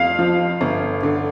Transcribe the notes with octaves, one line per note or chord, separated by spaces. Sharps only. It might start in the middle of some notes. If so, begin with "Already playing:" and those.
Already playing: F2 F5
F3
G1
D3